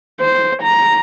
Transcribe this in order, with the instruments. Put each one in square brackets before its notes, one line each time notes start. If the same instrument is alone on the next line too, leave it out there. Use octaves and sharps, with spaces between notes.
[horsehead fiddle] C5
A#5